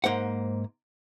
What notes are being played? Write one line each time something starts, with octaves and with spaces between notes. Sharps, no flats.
G#2 A#3 C5 F#5